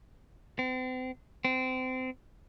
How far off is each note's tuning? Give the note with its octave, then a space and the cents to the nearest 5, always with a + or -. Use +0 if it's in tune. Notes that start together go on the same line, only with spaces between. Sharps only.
C4 -40
C4 -25